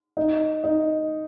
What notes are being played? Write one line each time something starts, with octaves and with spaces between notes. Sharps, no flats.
D#4
D#4